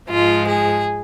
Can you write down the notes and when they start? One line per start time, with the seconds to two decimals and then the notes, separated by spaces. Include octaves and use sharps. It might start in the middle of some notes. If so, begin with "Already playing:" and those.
0.08 G#2 F3 G#3 F4
0.47 G#4